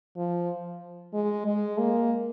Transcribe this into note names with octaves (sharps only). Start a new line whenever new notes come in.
F3
G#3
G#3
A#3